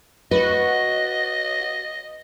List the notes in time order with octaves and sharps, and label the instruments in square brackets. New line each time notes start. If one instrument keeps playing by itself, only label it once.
[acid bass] F#4 [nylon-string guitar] B4 [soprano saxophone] D#5